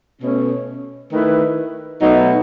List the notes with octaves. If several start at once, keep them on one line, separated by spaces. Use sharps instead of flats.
B2 A3 C#4
D#3 A3 E4 B4
B2 F#3 A3 D#4